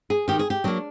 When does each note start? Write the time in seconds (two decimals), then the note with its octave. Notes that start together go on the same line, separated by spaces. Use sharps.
0.10 G#4
0.28 D#3 G4
0.39 G#4
0.50 G4
0.64 F#3 A#3 D4